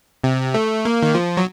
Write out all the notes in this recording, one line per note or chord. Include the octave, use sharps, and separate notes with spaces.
C3
A3
A#3
D#3
F3
F#3